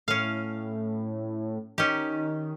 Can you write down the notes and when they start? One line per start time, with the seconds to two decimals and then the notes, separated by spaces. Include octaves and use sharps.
0.08 A2 C#4 F5
1.78 D#3 C#4 G4